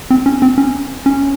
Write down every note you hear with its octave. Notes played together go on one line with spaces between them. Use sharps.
C4
C#4
C4
C#4
C#4